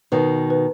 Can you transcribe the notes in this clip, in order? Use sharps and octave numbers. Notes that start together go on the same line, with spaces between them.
B2 D#3 B4
B4